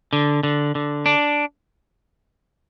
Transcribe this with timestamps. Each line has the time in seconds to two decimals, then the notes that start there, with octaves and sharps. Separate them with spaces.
0.13 D3
0.43 D3
0.75 D3
1.06 D4